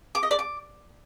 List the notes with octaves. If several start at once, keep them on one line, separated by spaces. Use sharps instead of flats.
D6
D#5
D5
D6